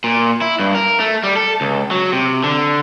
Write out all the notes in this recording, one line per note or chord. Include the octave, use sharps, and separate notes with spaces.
A#2
E4
G2
A#4
A3
G3
A4
C#2
F#3
C3
D3